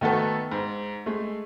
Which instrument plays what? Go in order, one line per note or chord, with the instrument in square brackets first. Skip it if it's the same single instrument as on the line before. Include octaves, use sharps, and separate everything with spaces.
[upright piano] D#3 A3 B3 F#4 A4
G#2
G#3 A3